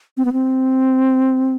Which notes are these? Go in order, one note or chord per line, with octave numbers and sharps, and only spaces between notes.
C4
B3
C4